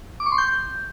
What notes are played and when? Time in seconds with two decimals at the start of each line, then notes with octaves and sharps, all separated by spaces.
0.20 D6
0.26 C#6
0.32 C6
0.38 G6